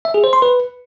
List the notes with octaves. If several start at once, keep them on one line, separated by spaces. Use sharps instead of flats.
E5
G#4
C5
C6
B4